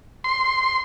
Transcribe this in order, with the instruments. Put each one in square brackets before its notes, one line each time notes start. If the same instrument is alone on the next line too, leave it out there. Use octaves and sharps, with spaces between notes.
[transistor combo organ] C6